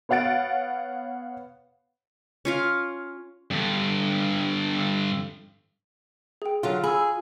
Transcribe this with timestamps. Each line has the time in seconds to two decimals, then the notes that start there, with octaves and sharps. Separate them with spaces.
0.09 B3 C#5 F5 F#5 A6 D7
2.45 C#4 F4 F5
3.51 G2 D3
6.42 G#4 G5
6.63 D3 F#3 F4
6.84 G#4 B5 E6